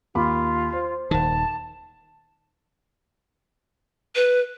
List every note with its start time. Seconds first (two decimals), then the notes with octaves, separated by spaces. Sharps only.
0.15 D#2 F4 B5 D6
0.73 C5
1.11 D#1 D#3 A5
4.15 B4